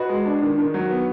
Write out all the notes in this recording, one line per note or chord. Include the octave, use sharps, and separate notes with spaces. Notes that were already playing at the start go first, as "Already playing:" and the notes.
Already playing: F#4 B4 D#5
G#3
D4
D#3
D#3
F#3
B3